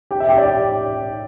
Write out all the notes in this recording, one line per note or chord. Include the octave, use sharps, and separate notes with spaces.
G4 G5
E5
G4 G5
D5